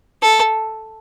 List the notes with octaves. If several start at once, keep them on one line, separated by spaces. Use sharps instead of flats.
A4